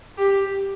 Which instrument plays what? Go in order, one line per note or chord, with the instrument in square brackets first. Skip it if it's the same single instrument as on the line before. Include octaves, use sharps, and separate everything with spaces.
[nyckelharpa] G4